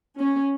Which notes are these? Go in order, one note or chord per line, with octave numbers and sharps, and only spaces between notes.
C#4